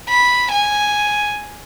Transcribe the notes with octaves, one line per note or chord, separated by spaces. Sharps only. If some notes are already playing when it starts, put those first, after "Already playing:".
B5
G#5